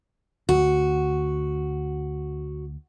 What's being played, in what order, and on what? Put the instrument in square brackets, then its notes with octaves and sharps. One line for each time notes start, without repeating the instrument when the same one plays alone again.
[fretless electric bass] D2 [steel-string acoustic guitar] F#4